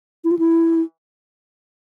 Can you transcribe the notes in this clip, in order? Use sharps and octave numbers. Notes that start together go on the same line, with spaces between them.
E4
F4
E4